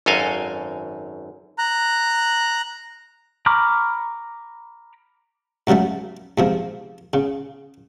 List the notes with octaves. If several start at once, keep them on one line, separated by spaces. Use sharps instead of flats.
G#1 F#2 A4 D#5 F5 G#5
A#5 F#6
A#5 B5 C#6 D6 F6
G#2 C#3 F#3 G3 A3
G#2 C3 F3
C#3